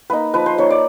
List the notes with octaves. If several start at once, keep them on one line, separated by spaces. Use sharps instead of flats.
A#3 D#4 B4
F3 B4
C5
A#3 D#4 C#5
D5